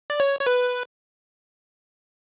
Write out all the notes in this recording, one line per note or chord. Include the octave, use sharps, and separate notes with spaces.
D5
C#5
C#5
B4